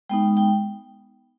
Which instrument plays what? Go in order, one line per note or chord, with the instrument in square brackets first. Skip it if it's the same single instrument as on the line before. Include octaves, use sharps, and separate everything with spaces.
[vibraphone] G#3 B3 D#4 G5
G5